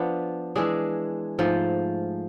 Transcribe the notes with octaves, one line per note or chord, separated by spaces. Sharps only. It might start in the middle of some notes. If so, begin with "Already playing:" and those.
Already playing: F3 B3 D4 F4
E3 G#3 D4 G#4
G#2 F3 A3